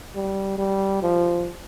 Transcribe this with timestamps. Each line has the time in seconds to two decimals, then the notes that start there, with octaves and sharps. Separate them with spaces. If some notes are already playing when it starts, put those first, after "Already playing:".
0.15 G3
0.58 G3
1.02 F3